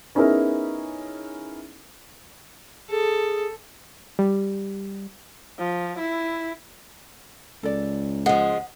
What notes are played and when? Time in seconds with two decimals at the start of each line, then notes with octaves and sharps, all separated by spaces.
0.15 B3 C#4 D#4 E4 G#4 A#4
2.90 G#4 A4
4.19 G3
5.58 F3
5.99 E4
7.63 C#2 A4 D5
8.26 F3 G#3 F#5